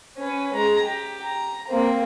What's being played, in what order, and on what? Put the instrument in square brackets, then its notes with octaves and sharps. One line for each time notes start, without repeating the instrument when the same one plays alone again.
[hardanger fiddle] C#4 B4
G#3 A#5
G4
A#5
A#3 C4